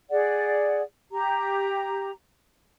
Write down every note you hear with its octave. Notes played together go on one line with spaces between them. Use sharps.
G#4 D5 F#5
G4 A#5